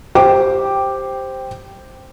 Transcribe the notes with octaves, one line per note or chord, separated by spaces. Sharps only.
G4 C5 G5 D6